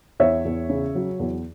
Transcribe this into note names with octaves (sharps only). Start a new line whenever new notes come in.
E2 C#5 E5
E2
C#3
F#3
E2